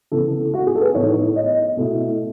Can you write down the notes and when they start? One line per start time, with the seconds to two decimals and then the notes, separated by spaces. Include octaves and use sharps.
0.12 C#3 E3 B3 A4
0.54 F#4
0.67 G#4
0.75 A4
0.81 B4
0.94 A2 E3 B3 D#4 C#5
1.36 D#5
1.77 B2 A3 E4